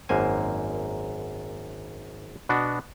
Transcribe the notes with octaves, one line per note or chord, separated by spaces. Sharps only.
G#1 F#2 A#3 C5 G#5
B2 B3 D4 F#4